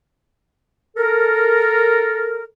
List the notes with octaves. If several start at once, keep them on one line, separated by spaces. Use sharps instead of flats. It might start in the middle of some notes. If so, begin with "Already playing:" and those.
A4 A#4